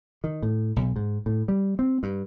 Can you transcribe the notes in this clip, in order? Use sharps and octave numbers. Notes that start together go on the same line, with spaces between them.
D#3
A2
B1
G#2
A2
G3
C4
G2